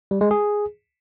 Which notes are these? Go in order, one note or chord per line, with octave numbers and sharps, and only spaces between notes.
G3
G#3
G#4